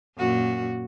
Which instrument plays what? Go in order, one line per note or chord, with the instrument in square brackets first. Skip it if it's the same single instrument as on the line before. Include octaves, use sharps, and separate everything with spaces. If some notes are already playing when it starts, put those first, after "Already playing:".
[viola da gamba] F#2 A#2 F#4